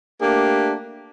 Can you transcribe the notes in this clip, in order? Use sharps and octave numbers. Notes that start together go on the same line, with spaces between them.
A3 A#3 D4 G4